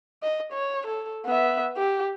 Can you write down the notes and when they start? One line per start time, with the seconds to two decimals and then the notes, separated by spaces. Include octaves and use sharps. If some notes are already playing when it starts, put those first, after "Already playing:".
0.23 D#5
0.52 C#5
0.86 A4
1.25 B3 E5
1.77 G4